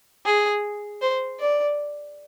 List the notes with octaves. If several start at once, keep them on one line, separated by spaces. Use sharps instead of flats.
G#4
C5
D5